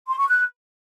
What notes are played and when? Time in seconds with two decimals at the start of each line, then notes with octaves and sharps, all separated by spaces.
0.08 C6
0.18 C#6
0.28 F#6